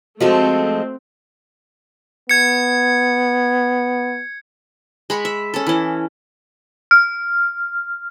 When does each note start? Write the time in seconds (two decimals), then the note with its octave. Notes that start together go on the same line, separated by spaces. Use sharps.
0.20 F3 G#3 A3 C4 F#4 A4
2.29 B3 G#6 C#7
5.10 G#3 B5 C#6
5.25 E5
5.54 C#4 A4
5.67 E3 C#4
6.91 F6